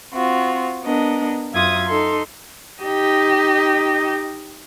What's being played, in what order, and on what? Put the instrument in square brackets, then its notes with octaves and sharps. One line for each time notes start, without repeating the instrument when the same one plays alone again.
[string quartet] C4 F4 F#4
B3 D4 A#4 D#5
F#2 F4 E5 D#6 G#6
D#4 A4 C6
[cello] D#4 G4